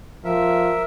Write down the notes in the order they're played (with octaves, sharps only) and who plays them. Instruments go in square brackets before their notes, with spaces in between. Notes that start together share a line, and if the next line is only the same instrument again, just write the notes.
[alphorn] F3 [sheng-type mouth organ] A#4 E5